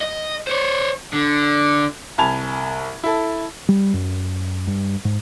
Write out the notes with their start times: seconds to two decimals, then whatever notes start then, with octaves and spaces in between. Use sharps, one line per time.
0.01 D#5
0.47 C5 C#5
1.13 D3
2.18 C2 G#5 A5 B5 G#6 F7
3.03 E4 A4
3.69 G3
3.94 F#2
4.67 G2
5.05 G#2